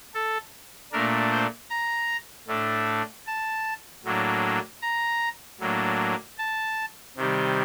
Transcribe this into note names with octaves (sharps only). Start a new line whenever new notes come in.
A4
A#2 A3 D4 A#4
C5
A#5
A2 A3 D4
A5
A2 F#3 A#3 D4
A#5
A2 F#3 A#3 D4
A5
C3 D#3 G3